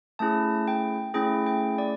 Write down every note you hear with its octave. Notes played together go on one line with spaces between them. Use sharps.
A3 C#4 E4 G#4 A5
G5
A3 C#4 E4 G#4 G5
G5
D5